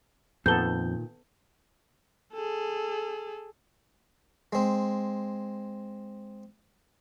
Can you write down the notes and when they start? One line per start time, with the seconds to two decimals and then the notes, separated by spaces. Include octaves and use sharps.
0.46 F2 A#2 D#3 B3 A4 G6 G7
2.33 G#4 A4
4.53 G#3 C4